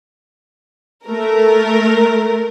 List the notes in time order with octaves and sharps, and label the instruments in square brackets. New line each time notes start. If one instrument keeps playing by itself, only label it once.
[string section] A3 A#4